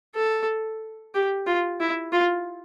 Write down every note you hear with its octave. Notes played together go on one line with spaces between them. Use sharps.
A4
G4
F4
E4
F4